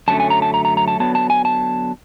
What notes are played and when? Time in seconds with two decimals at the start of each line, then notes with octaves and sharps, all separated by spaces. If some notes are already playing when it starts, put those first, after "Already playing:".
0.08 F#2 D3 F#3 A3 C#4 A5
0.20 G#5
0.30 A#5
0.42 A5
0.54 A#5
0.65 A#5
0.77 A#5
0.88 A5
0.99 D3 F#3 B3 A5
1.15 A5
1.30 G#5
1.45 A5